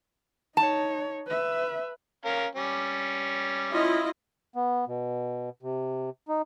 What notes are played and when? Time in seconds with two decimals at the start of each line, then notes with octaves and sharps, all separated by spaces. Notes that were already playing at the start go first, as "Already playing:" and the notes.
0.57 D#4 C#5 A5
1.27 B4 E5
2.25 C#4 A#4 F5
2.55 G3 C#4
3.73 E4 F4 D#5
4.55 B3
4.87 B2
5.62 C3
6.28 D#4